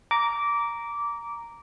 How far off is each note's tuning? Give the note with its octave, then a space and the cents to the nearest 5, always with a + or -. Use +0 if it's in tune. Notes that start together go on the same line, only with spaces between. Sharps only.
A#5 +0 D6 -15